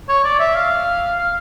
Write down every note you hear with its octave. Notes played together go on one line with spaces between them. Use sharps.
C#5
D5
E5
F5
F5